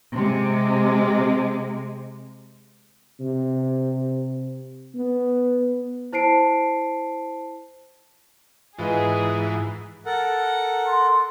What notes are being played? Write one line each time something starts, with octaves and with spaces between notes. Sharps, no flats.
C3 G#3
C3
B3
E4 C5 A5 C7 D7
G#2 E3 F4 G#4 B4 D#5
A4 A#4 F#5
C6